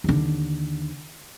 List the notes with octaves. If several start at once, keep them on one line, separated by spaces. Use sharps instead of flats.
D#2 D3